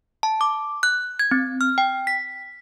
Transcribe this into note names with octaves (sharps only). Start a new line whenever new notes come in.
A5
D6
F#6
G#6
C4
F6
G5
B6